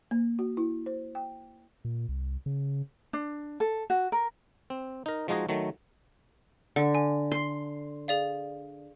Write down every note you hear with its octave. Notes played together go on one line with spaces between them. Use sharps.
A#3
F#4
E4
C5
G5
A#2
C2
C#3
D4
A4
F#4
A#4
C4
D#4 A#4
F3 G#3 D#4 F#4 G#4 D#5
D#3 F#3 A3
D3 F#5
G#5
C6
G#4 D5 F5